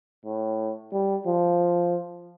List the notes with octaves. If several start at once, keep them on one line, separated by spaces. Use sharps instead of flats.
A2
G3
F3